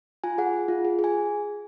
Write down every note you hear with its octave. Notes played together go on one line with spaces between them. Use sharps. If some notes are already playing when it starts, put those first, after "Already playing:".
F4 G#5
G#4 F#5
G#4
F4
G#4
G#4
G#5